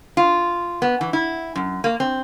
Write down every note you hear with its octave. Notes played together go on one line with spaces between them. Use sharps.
F4
B3
E3
E4
F#2
A#3
C4